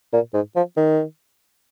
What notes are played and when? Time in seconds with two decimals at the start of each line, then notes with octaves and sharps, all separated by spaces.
0.13 A#2
0.34 G#2
0.56 F3
0.76 D#3